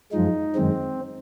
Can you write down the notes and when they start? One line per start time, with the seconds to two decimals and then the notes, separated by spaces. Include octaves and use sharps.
0.12 F#2 F3 G#3 D#4
0.55 F#2 D#3 G#3 C4